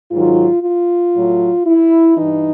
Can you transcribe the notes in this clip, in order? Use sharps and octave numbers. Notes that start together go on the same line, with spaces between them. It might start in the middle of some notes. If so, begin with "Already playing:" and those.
G#2 D#3 F#3 F4
F4
A2 F#3
E4
G2 E3 D#4